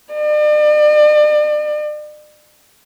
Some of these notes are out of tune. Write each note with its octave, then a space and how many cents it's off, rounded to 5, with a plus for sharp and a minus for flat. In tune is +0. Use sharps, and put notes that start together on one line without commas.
D5 +40